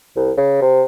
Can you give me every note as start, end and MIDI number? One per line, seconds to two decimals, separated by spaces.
0.16 0.31 36
0.37 0.60 49
0.61 0.84 48